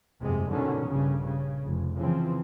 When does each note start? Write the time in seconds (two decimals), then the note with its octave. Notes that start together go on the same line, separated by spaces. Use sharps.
0.21 G1 F2 C3 G#3
0.50 B2 D3 D#3 C#4
0.87 A#1 G2 C#3
1.26 C#3
1.65 F1
1.97 C#3 E3 F3 C4